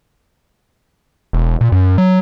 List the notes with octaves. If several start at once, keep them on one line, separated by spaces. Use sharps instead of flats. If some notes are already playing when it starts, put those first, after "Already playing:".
E1
A#2
F#2
F#3